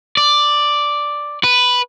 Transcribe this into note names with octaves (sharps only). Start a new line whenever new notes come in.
D5
B4